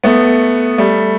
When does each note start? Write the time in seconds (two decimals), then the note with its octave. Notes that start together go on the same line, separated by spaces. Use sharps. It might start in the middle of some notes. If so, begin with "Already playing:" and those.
0.04 A3 B3
0.78 G3 A3